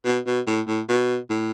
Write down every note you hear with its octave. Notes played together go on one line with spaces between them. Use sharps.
B2
B2
A2
A2
B2
A2